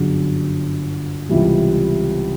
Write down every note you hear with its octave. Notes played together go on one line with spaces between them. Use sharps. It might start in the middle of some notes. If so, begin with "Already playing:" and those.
Already playing: G1 F#2 D3 F#3 G#4
C#2 C3 E3 G3